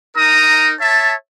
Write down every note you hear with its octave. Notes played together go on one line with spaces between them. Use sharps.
D#4 A#4 A#5 D#6
C#5 E5 A5